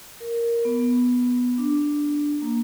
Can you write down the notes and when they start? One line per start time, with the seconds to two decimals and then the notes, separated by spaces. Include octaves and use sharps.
0.20 A#4
0.65 B3
1.58 D4
2.42 A#3